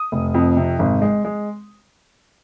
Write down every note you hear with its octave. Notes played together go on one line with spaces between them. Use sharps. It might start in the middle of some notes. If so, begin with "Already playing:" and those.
Already playing: D#6
F1
F2
C3
G#1
G#3
G#3